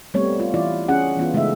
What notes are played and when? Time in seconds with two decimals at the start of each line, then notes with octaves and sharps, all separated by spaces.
0.14 G3 A3 B3 C4 C#5
0.40 F4
0.54 E3 E4 F4 D5
0.88 C#4 G#4 F#5
1.17 E3 B3 F4
1.33 C#3 G#3 A3 D#4 E5